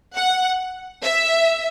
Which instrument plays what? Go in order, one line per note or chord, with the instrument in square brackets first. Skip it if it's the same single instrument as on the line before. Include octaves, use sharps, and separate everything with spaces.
[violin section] F#5
E5